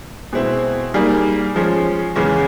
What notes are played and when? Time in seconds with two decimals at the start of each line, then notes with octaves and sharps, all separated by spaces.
0.33 B2 G#3 C4 E4
0.94 G3 A#3 D#4 G#4
1.56 F3 G#3 C#4
2.16 E2 C#3 E3 G#3 C#4